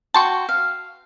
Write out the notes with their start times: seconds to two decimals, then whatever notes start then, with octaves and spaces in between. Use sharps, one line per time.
0.14 F#4 G5 A5 C6 C#6
0.49 F5